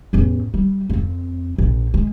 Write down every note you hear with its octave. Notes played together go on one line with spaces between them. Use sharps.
A1 E2
G3
F2 C4
A#1
G#3